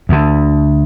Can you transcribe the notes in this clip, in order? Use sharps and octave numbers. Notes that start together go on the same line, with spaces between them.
D2 D3